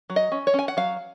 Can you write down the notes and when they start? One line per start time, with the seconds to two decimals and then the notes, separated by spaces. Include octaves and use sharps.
0.10 F#3
0.16 D#5
0.32 C#4
0.47 C#5
0.54 C#4 G#5
0.68 F#5
0.77 F#3 F5